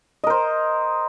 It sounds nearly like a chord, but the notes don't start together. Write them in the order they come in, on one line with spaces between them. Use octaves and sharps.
D#5 A#4 C5